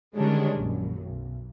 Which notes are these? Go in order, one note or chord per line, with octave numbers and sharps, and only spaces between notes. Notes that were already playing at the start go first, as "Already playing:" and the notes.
D3 D#3 G3 G#3 C#4 D4
A#1 F#2
B1